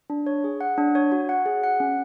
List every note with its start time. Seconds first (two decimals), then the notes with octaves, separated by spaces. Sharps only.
0.10 D4
0.27 C#5
0.44 G#4
0.61 F#5
0.78 D4
0.95 C#5
1.12 F#4
1.29 F#5
1.46 G#4
1.63 F#5
1.80 C#4